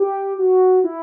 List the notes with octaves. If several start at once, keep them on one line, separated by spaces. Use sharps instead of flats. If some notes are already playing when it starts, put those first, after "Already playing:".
Already playing: G4
F#4
E4